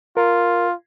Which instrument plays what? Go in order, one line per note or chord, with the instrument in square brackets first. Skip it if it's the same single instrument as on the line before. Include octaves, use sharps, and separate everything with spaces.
[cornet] F4 [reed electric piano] A#4